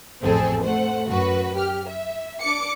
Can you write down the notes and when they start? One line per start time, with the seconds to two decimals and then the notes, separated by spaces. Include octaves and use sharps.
0.21 A1 F2 C4 G#4 A4
0.63 A3 C5 F#5
1.06 F#2 F#4 B4
1.55 G4 F6
1.88 E5
2.40 D4 D6 C#7